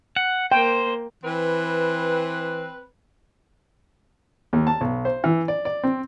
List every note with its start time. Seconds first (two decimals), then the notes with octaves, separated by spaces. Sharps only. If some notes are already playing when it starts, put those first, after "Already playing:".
0.16 F#5
0.52 A#3 C5 G5
1.24 E3 C4 B4
4.53 D#2
4.67 A5
4.81 B1
5.05 C5
5.24 E3
5.48 D5
5.65 D5
5.84 C4